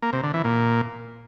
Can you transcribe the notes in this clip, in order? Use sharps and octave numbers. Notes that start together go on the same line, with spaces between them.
A#3
C3
D3
E3
A#2